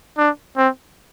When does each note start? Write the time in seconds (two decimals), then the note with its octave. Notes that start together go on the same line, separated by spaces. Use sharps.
0.18 D4
0.57 C4